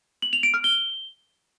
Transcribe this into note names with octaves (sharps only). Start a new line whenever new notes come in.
F#7
F7
D7
F6
G7